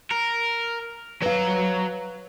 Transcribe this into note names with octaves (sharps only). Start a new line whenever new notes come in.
A#4
F#3 B4 F5 A#5